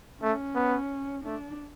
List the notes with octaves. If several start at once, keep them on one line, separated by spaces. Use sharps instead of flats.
A3 C#4
B3
A3 D4